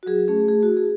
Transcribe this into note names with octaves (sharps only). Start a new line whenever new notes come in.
F#4
F#3 G#4
A3 C#4 G#4
A3 G#4
F#4
E4
G#4